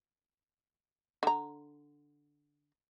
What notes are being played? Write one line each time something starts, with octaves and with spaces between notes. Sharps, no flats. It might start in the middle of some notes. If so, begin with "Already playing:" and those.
D3 A#5